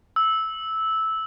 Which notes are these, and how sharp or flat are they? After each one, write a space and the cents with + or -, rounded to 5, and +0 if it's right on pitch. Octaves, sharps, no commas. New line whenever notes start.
E6 -10